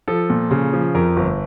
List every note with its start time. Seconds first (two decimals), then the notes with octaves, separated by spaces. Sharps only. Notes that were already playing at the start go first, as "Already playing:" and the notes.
0.08 F3 A4
0.30 A#2
0.51 C#3
0.73 F3
0.95 F2 A#4
1.16 G1